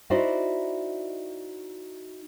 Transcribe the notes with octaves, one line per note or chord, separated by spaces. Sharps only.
D#4 E4 F#4 C5 D5 D#5